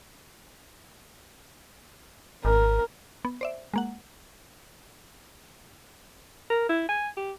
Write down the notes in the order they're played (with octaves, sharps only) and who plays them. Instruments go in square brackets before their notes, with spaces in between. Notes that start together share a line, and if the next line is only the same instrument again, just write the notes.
[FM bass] G#1 [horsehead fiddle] A#4
[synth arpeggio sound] B3
C5 D5 E5
G#3 A#3 F#5
[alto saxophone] A#4
E4
G#5
G4